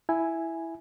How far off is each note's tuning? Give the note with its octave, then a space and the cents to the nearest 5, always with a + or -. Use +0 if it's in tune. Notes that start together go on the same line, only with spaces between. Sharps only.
E4 +0 G#5 +0